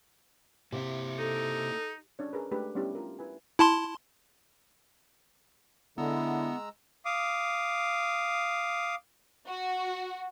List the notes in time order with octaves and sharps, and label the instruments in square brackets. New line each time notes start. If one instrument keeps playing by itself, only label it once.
[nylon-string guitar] C3 [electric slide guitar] A#3 E4 E5
[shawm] D#4 [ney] A4
[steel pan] C#4 D4 C#5
G#4 A#4 B4
G#3 A3 D4 G4 B4
G3 B3 C#4 D4 E4 G4
F4 A#4
E4 B4 G#5
[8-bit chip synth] E4 A5 C6
[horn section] D3 [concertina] G#3 A#5 E6 [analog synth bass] B3 [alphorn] E4
[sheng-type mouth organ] F5 D6 D#6
[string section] F#4